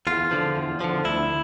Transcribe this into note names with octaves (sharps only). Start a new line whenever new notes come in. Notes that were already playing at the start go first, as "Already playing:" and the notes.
E2 F4
D3 F3
E2
D3 F3
D2 E4